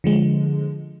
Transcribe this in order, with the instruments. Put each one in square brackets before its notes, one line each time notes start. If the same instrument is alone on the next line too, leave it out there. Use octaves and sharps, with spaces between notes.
[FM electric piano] D3 F3 G#3